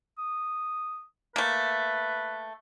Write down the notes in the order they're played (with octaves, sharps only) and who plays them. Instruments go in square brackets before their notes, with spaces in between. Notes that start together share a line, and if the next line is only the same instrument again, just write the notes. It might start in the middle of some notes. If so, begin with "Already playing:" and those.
[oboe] D#6
[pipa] A3 A#3 [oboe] B4